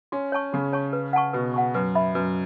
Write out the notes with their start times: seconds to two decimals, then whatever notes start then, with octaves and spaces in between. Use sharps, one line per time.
0.12 C#4 F#4
0.32 C#5 A5 C#6
0.53 C#3 F#4
0.73 C#5 A5 C#6
0.93 B4
1.13 F#5 A5 C#6
1.33 B2 B4
1.54 F#5 A5 C#6
1.74 F#2 B4
1.95 E5 B5
2.15 F#2 B4